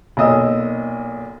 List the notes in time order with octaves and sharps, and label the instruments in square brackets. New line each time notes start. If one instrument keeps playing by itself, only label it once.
[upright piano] B1 A#2 D#5 D#6 E6